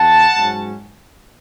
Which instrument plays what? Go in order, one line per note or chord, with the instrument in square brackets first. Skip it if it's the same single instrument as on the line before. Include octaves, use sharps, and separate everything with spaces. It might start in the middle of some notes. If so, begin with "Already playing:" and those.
Already playing: [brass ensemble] E2 F#5 A5
G#2 F#3 C#4